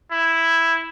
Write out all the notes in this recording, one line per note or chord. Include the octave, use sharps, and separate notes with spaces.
E4